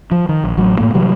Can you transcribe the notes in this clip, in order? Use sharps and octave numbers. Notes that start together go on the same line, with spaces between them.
F3
D#3
A#1
A1 F#3
A2 A#3
C3 E3 F#3 G3